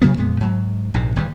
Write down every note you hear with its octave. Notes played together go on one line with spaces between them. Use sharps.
C3 F#3 A#3 B3
F2 A#2 G#3 B3
G#2 F#3
A#1 G#2 C3
G1 D#2 G#2 G3